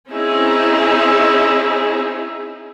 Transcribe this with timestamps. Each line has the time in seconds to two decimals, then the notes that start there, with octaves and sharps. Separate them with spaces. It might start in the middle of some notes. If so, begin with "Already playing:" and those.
0.11 C4 C#4 D#4 E4 G#4